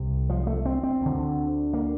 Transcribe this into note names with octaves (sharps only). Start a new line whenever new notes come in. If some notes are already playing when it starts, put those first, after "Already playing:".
Already playing: C2 C3
F3
A3
C4
C4
D2 D3
A#3